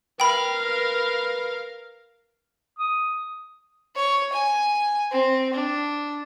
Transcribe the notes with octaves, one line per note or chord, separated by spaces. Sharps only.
A#4 B4 F5 G5 B5
D#6
C#5
G#5
C4
D4